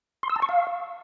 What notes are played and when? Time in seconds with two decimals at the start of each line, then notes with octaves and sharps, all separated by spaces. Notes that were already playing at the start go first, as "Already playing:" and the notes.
0.23 C6
0.30 E6
0.36 A5
0.42 C#6
0.49 F5